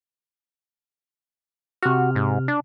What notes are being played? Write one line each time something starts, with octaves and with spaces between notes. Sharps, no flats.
C3 F#4 F6
G#2
D4